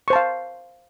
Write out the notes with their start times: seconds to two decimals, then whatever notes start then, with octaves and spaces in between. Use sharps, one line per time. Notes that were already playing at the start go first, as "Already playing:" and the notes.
0.08 C#6
0.10 C5
0.13 A5
0.16 F5